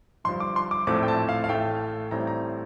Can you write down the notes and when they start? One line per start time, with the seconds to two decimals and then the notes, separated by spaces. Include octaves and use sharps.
0.24 G1 G2 F3 C6
0.40 D6
0.56 C6
0.71 D6
0.87 A#1 A2 F3 A3 C4 D6
1.03 G5
1.08 A5
1.29 F5
1.44 F5
1.49 A1 A2 A3 G5
2.11 A1 A2 G3 C4 A#5
2.27 A#5